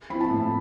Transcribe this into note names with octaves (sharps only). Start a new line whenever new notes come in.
F3 C4 E4 B5
A5
A2